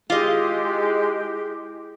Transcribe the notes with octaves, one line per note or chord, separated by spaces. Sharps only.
G#3 E4 F4 G4 G#4 D#5 D6